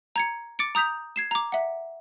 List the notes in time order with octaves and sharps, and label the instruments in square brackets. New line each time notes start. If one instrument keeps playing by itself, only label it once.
[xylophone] A#5 G#6 C#7
D6 A6 C#7 D7
A#5 D#6 G6 B6 F7
G#6 C7 E7
A#5 D6
E5 F#5